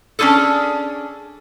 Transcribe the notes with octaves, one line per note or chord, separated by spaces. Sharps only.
C#4 D4 F4 G#4 A4